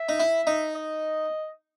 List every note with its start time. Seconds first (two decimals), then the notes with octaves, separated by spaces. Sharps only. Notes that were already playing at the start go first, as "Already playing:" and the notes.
Already playing: E5
0.09 D#4
0.20 E4
0.47 D#4
0.75 D#5